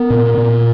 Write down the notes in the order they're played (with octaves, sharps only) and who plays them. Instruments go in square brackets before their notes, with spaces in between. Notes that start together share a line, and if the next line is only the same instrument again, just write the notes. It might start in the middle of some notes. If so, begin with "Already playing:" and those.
Already playing: [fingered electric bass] B3 [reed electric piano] A#4
[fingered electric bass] A#2
A#2